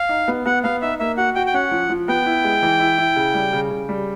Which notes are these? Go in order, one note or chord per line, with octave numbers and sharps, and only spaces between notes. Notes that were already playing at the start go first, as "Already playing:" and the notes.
Already playing: F5
D#4
B3
B3 F#5
B3 F5
D#4 E5
A#3 E5
F#4 F#5
F#4 G5
G5
C#4 F#5
F3
F3
B3 G5
E4
G#3
E3
E4
E4
C#3
G3
C#3
C#3
G3